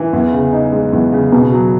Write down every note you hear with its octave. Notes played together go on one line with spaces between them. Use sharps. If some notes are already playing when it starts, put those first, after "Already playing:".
Already playing: E3
E2
C#3
D#4
G#3
E2
C#3
B2
F#3